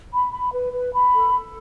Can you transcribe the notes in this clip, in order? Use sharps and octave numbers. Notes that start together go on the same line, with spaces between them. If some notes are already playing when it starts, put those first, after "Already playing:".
B5
B5
B4
B4
B5
A4
A4